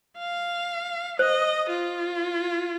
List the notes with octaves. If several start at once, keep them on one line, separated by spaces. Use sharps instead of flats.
F5
C5 D#5
F4